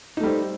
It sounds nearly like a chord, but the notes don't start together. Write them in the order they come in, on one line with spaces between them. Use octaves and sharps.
D#4 A3 G3 C5